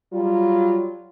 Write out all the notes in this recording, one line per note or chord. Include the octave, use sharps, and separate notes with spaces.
F#3 G3 F4